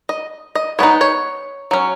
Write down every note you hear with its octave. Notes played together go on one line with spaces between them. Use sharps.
D#5
D#5
G#3 B3 D#4 C#5
C#5
F#3 C#4